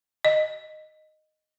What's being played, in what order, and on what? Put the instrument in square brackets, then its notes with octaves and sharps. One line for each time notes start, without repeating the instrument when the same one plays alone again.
[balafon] D#5